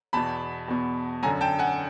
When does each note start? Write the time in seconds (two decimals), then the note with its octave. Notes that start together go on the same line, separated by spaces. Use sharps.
0.13 E2 B2 A5 B5
0.68 E2 B2
1.23 F#2 D3 G#5 A#5
1.41 G5 A5
1.59 F#5 G#5